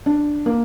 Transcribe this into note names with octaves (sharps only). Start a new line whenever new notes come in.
D4
A#3